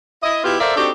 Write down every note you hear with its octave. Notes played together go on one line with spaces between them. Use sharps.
E4 D#5
B2 B3 E4 F4 G4
A4 A#4 C5 D5 E5 F5
C4 D4 D#4 F#4 G4 A4